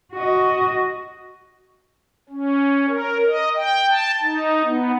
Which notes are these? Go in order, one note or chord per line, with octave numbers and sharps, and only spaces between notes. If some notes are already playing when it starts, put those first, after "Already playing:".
F#4 D#5
C#4
A#4
D#5
G5
A5
D#4
B3